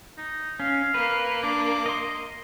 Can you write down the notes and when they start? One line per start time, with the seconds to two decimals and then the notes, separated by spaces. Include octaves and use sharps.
0.18 D#4
0.60 C#4 F5
0.94 A#3 B4
1.43 D4 D6
1.86 D#5 C6